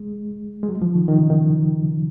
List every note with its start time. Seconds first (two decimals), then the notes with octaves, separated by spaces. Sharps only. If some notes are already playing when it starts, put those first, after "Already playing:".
Already playing: G#3
0.63 G#3
0.69 F#3
0.82 F3
0.95 D#3
1.08 D#3
1.19 C#3
1.30 D#3